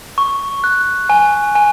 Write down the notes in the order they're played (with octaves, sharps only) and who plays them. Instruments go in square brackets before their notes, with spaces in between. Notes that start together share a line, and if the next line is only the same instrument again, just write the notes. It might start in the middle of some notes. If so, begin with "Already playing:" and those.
[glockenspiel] C#6
F#6
G#5
G#5